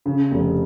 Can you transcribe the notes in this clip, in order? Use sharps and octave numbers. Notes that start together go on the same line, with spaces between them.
C#3
F1